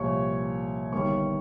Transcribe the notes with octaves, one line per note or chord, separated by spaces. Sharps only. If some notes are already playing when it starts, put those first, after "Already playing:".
Already playing: C2 A#2 F3 C#5 C#6
G1 G2 D#3 G3 A#3 C#5 C#6